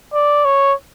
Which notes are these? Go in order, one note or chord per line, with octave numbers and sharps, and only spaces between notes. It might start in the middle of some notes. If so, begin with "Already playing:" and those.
D5
C#5